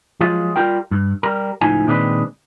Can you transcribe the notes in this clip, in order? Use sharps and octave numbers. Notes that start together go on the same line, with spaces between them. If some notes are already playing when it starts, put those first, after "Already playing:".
F3 F#3 G#3 F4
G3 F4 A#4 G5
G2
G3 A#4
C#2 A2 F3 D#4 G#5
A#2 D#3 G#3 C4 D4 B4